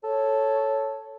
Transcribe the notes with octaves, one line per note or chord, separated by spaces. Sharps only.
A4 C#5